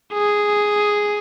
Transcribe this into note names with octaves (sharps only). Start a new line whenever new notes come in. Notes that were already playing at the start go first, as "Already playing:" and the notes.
G#4